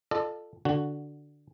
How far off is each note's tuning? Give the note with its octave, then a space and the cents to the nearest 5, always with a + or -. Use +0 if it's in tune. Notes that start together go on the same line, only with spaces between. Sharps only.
F4 +0 A4 +0 D5 +45
D3 +0 F#4 +0